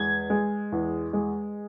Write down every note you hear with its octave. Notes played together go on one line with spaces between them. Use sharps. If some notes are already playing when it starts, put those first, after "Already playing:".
Already playing: E2 G#3 G#6
G#3
E2
G#3